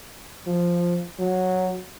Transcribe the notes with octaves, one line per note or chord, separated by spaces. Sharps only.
F3
F#3